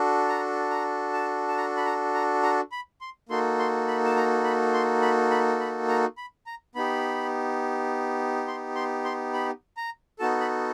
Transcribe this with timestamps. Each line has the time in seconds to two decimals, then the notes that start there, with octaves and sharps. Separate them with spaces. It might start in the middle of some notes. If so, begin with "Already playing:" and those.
Already playing: D4 F#4 A4
0.28 A#5
0.70 A#5
1.13 A5
1.48 A5
1.57 A#5
1.77 B5
1.86 A#5
2.14 A#5
2.43 A#5
2.72 B5
3.01 C6
3.29 A#3 D#4 F#4 A4 C6
3.59 C6
3.88 B5
4.05 A5
4.16 A#5
4.44 B5
4.74 C6
5.02 B5
5.31 B5
5.60 B5
5.88 A#5
6.17 B5
6.46 A#5
6.75 B3 D#4 G4 B5
8.47 C6
8.75 C6
9.04 C6
9.34 B5
9.77 A#5
10.19 B3 D#4 F#4 A4 A5
10.41 B5